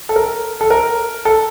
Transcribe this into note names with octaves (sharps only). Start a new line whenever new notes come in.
A4
A#4
A4
A#4
A4